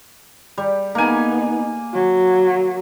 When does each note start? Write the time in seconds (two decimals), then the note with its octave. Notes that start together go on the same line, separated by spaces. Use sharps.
0.58 G3
0.95 A#3 B3 D#4 G#5
1.94 F#3